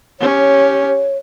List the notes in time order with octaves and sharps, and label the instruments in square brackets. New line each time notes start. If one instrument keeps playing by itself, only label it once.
[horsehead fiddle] C#4 G4 [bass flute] C#5